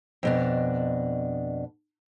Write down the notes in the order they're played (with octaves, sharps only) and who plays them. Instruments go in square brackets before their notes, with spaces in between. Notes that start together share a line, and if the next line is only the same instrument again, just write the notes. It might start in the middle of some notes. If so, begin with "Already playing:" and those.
[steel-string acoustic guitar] F2 B2 D4